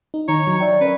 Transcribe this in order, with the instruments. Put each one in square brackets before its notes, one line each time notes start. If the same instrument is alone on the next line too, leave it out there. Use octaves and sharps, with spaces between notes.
[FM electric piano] D#4
[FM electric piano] D#3 D#4 [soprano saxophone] C#5 [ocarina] A#5
[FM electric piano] F#3
[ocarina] D5 [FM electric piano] E5 G5
[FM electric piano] C#4 A#4 [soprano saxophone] B4